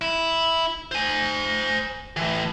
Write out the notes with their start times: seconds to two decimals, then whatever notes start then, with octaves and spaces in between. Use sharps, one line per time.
0.01 E4
0.92 C5 G#5
2.17 A2 E3